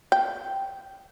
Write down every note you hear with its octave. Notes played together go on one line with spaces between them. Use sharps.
G5